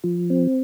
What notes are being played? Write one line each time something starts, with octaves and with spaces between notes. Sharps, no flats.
F3
C4